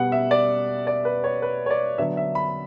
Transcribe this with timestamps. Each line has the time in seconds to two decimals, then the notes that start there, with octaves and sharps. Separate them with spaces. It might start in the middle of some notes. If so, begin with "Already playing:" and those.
Already playing: B2 G3 B3 F#5
0.12 E5
0.31 D5
0.87 D5
1.05 B4
1.24 C#5
1.42 B4
1.66 C#5
1.70 D5
1.98 D3 F#3 B3 D4 E5
2.17 E5
2.35 B5